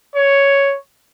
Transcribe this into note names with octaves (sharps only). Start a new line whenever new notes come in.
C#5